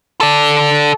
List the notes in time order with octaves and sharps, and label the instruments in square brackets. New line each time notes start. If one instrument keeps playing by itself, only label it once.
[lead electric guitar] A4 D5